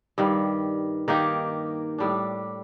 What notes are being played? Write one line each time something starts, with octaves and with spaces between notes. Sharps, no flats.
G2 D#3 G3
D#3 A#3 D#4 G4
A2 G3 D4